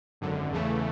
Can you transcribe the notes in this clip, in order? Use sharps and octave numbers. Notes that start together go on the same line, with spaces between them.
G#1 F#2 D3
E2 C#3 E3 A3